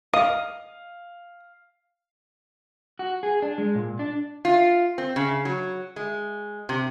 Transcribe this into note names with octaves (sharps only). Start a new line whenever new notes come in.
D#5 F5 D#6
F#4
G#4
D4
G#3
A#2
D4
F4
C4
C#3
F#3
G#3
C3